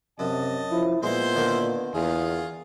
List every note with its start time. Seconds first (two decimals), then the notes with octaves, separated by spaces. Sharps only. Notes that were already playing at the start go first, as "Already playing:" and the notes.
0.19 F#2 C3 D#5 A5
0.71 F3 E4
1.03 A#2 G#3 B3 E4 C5 A#5 C6
1.36 D3 D#3 A#3
1.94 E2 F4 G#4 F5